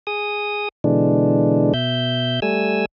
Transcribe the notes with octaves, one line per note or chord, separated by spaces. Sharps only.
G#4 D#6
B2 D3 E3 G#3 D4
B2 E5 G6
G3 A3 G#5 E6